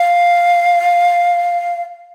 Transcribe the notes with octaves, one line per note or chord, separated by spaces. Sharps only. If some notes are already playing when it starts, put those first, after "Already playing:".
Already playing: F5